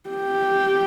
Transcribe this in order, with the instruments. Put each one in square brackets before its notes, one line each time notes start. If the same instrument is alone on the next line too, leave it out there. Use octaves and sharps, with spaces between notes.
[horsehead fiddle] G4